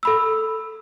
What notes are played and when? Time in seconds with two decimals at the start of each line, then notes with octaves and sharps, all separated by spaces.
0.03 A4 B5 E6